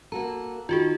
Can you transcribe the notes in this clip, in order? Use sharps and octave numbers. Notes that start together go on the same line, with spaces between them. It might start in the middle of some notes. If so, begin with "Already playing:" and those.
A#3 F#4 A4 A#5
D#3 F4 F#4 G#4